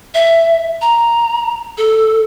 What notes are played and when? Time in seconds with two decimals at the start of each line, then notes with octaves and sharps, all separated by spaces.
0.14 E5
0.81 A#5
1.78 A4